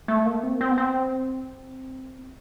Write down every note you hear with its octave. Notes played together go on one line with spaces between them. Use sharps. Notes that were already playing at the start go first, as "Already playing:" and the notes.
A3
A#3
C4
C4
B3
C4